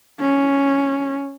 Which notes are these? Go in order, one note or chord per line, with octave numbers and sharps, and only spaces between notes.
C#4